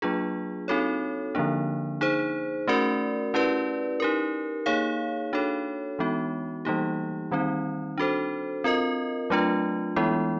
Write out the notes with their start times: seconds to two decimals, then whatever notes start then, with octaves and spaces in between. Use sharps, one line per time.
0.02 F#3 A#3 D4 F4 G#4
0.68 C4 D#4 F#4 A4 C#5
1.35 D3 F3 A#3 D4
2.01 D#4 G#4 C5
2.68 A3 C#4 F#4 A#4 D5
3.34 C#4 E4 G4 B4 D5
4.00 D#4 G4 A#4
4.66 A#3 D#4 G#4 C#5 F5
5.33 D4 F#4 A4 C#5
5.99 E3 G#3 B3 D#4 F#4
6.65 E3 G3 A#3 D#4 G4
7.31 D#3 G3 C4 D#4
7.98 D4 F#4 A4 C5
8.64 C4 F4 A#4 D#5
9.30 F#3 A3 D4 F4
9.96 E3 G#3 B3 E4